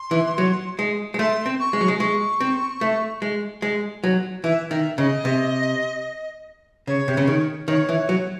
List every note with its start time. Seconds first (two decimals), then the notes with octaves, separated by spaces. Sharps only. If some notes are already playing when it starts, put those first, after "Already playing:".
Already playing: C6
0.11 E3
0.38 F#3
0.79 G#3
1.14 G#3
1.19 A3 C6
1.46 C4
1.60 C#6
1.73 G#3
1.81 F#3
1.88 G#3
2.00 G#3 C#6
2.41 C4
2.81 A3
3.22 G#3
3.62 G#3
4.04 F#3
4.44 E3 E5
4.71 D#3 E5
4.98 C#3 D#5
5.25 C3
6.87 C#3 C#5
7.08 C3
7.17 C#3
7.28 D#3
7.68 D#3 C#5
7.89 E3
8.09 F#3